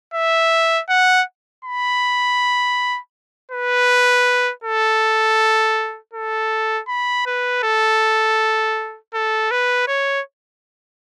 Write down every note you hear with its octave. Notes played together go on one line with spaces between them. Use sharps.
E5
F#5
B5
B4
A4
A4
B5
B4
A4
A4
B4
C#5